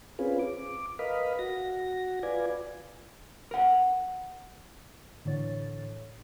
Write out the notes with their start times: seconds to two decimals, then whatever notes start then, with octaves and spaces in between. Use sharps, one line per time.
0.19 C4 C#4 F4 G#4 B4
0.39 D6
0.99 A#4 B4 D#5 F5 B5
1.39 F#4 A#6
2.23 F4 B4 D5 G#5
3.51 A#4 F#5
5.25 A2 D3 E3 C#5 A6